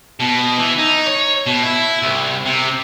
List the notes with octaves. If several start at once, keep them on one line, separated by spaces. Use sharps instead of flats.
B2
E3
D#4
C#5
B2
E4
C2
C3